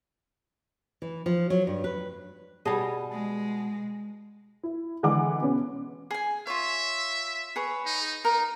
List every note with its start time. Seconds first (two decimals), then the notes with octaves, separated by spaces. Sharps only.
1.02 E3
1.26 F3
1.50 F#3
1.67 G2
1.84 B4
2.65 B2 G3 G#4 D#5 A5
3.12 G#3
4.63 E4
5.03 D3 E3 G#3 F#5 D6
5.40 B2 B3 C#4
6.11 G#4 G#5
6.47 F4 C#5 E5
7.56 G#4 B4 C#5
7.86 D#4
8.25 D#4 A#4